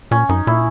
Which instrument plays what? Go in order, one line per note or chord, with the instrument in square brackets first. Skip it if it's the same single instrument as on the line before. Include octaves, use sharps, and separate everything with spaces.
[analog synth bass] A#2 [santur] C#4
[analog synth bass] F#2 [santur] D#4
[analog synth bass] A#2 [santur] E4